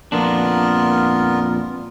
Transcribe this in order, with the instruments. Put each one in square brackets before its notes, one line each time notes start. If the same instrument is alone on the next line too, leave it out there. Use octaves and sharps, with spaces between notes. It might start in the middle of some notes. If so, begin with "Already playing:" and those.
[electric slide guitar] F2 A#2 D4 [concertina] B3 F4 A#4